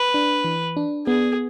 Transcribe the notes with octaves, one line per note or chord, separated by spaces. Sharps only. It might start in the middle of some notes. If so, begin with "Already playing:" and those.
Already playing: B4
D4
E3
D4
B3 G#4